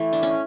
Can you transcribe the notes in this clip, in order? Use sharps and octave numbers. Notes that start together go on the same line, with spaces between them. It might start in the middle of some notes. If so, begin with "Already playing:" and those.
Already playing: E3 A3
D4
C#4